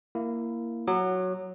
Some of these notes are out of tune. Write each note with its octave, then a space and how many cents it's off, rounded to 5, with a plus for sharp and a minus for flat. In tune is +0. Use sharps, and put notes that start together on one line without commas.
A#3 +0 E4 +15
F#3 +0 D6 +45